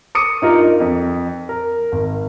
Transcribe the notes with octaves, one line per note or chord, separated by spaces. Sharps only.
D6 D#6 C#7 D#7
G2 D#4 F4 A#4
F2
A#4
G#1